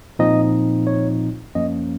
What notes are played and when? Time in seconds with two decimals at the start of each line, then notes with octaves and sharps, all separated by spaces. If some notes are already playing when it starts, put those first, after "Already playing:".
0.19 A#2 F3 C4 D#4 D#5
0.87 C#5
1.55 F#2 F3 A#3 C#4 D#5